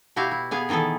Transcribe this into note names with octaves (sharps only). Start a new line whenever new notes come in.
B2 E4 F#4 G4 F5
E4
B3 G#4 F5
D#3 E3 B3 G#4 A4